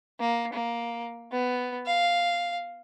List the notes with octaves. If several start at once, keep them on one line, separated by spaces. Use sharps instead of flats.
A#3
A#3
B3
F5